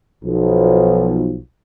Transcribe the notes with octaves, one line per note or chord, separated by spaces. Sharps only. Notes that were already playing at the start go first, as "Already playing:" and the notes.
B1 F3